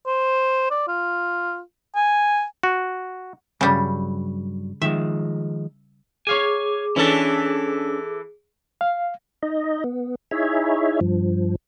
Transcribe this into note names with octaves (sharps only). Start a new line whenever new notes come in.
C5
D5
F4
G#5
F#4
G2 C#3 F#3 G3
D#3 F3 G#3 E5
G#4 C#5 F5 G#5 D6
E3 C#4 D4 A4
F5
D#4 D#5
B3
D#4 E4 G#4 C#5 E5
G2 F3